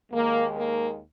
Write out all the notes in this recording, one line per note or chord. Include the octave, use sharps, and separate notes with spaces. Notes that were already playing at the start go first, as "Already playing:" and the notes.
D#2 D#3 G#3 A#3
A#3